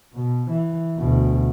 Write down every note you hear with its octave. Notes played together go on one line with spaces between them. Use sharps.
B2
E3
D2 B2